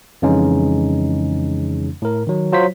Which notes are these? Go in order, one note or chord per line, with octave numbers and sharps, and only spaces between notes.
F2 C#3 E3 G#3 C#4 D#4
A2 A#4
D#3 F#3
F#3 F4 C5 C#5 B6